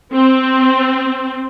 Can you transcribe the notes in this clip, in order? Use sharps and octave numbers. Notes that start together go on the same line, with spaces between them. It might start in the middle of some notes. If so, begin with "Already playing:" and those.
C4